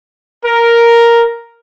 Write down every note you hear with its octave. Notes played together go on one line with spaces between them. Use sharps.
A#4